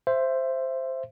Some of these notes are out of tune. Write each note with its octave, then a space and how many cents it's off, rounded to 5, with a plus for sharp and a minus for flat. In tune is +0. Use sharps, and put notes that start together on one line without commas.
C5 +0 E5 +20